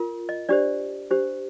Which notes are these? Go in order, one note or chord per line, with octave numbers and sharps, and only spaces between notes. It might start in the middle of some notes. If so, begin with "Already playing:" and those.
Already playing: F4 A#4
D#5
D4 G4 C5 D5
D4 G4 C5